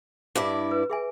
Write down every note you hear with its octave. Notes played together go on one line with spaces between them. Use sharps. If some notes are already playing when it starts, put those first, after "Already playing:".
G2 E4 D5
B4
G#4 E5 G#5